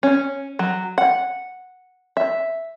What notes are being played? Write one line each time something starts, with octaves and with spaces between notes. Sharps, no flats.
C#4
F#3
F#5
E5